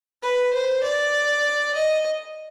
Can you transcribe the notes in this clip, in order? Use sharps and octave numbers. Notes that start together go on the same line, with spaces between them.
B4
C5
D5
D#5